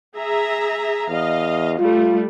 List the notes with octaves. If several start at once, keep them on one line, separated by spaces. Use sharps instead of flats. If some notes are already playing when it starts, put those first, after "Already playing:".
G#4 E5 A#5
E2 D#5 F5
G3 A3 F4